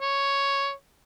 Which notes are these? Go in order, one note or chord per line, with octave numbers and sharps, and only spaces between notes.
C#5